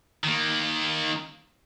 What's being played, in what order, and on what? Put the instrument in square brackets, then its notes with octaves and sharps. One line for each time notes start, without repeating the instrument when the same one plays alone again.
[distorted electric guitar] D#3 A#3